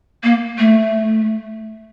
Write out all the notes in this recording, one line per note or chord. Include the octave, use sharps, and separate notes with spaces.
A#3
A3